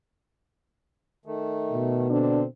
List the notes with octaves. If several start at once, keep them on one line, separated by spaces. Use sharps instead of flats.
D#3 A3
B2
D3 C4 D4